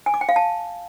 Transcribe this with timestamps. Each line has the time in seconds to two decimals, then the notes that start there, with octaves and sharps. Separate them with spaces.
0.06 G#5
0.14 D6
0.21 G5
0.29 F5
0.36 A5